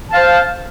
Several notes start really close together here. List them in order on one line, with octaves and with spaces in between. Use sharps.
A5 F5 C5